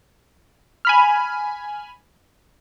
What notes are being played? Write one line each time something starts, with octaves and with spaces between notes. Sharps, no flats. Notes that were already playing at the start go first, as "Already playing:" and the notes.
G#5 B5 F6